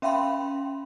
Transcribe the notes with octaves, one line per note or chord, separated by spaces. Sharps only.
C#4 E5 F5 G5 B5 C6